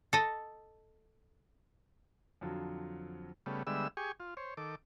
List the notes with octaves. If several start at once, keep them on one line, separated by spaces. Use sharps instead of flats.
A4 D#5
F2 D3 F#3 F4
C#3 G3 A3 B3
D3 G3 G#3 B3 E5 E6
G4 G#4 G#5 C#6
F4
C5 C#5
D#3 A4 D6